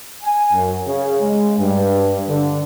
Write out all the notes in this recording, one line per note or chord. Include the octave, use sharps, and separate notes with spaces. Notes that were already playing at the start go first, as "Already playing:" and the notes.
G#5
F#2
C#3
G#3
G2
D3